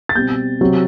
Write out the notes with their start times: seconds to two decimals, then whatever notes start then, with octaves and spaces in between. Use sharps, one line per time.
0.09 A6
0.15 B2 G3 C4 G6
0.61 C3 F#3 C4